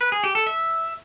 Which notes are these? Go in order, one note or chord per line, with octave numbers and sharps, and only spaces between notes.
B4
G#4
G4
A4
E5